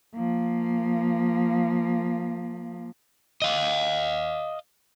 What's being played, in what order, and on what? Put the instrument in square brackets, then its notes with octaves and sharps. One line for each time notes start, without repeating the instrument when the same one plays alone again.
[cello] F3 A#3
[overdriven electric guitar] D#5 F5